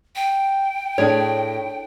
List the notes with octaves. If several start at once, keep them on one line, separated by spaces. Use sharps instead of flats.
G5
A2 D4 G#4 C#5